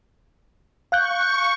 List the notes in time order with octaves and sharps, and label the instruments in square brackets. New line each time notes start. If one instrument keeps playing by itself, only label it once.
[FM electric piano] F5 F#6 G6 [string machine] C#6